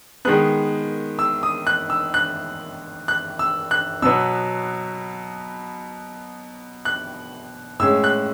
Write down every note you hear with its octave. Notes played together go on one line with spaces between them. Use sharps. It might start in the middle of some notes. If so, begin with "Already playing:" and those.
D#3 G#3 B3 F#6
E6
D#6
F#6
E6
F#6
F#6
E6
F#6
B2 F#3 B3 E6
F#6
A2 G#3 C#4 E6
F#6